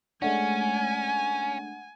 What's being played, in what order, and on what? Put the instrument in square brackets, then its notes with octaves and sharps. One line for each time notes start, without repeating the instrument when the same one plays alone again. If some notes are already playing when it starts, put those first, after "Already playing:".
[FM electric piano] G#3 A3 D4 [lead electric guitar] C#4 [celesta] F#5 [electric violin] G#5